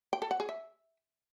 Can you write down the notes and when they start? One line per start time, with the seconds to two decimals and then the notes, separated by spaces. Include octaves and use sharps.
0.13 G5
0.22 A4
0.31 F#5
0.40 G#4
0.49 E5